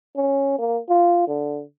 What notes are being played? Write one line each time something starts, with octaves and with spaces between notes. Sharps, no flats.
C#4
A#3
F4
D3